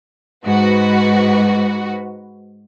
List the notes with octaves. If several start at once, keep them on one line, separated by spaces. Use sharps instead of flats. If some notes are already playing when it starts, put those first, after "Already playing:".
G#2 F#4 B4